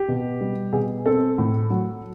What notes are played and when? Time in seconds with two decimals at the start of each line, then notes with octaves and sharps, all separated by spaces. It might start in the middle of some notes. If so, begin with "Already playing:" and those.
Already playing: G4
0.08 B2
0.41 G3
0.73 B2 G#4
1.06 C4 A4
1.38 A2
1.70 F#3